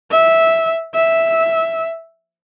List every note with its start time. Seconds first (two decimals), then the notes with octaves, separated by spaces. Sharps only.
0.11 E5
0.94 E5